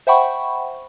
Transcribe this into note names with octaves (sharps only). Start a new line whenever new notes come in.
C5 E5 F#5 G5 B5 C#6